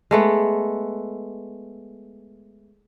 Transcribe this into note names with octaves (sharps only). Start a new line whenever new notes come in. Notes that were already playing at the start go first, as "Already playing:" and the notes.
G#3 A3 B3